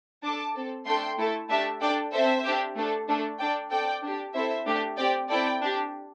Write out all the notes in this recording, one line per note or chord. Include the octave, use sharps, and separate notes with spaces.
D4 A4 A5 D6
C4 A4
A3 D4 A4 G5 C6
A3 E4 A4
A3 D4 G4 E5 A5
D4 A4 D5 G5
C4 A4 C5 E5
D4 G4
A3 D4 A4
A3 D4 A4
D4 A4 D5 G5
C4 A4 D5 G5
D4 G4
C4 E4 A4 C5 E5
A3 D4 G4
C4 G4 D5 G5
C4 E4 A4 D5 G5
D4 G4